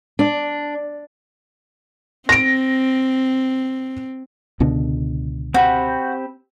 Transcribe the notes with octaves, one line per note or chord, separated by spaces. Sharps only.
D4
C4 A#6 D7
C#2 B2 D3
C4 F#4 G4 B5